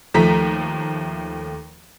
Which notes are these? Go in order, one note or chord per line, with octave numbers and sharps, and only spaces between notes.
D#2 F3 A3 A#5 B6